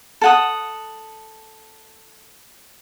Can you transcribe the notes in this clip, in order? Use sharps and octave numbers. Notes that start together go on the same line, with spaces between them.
A4 F#5 D#6